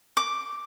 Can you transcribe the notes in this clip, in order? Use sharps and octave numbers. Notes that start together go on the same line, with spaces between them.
D6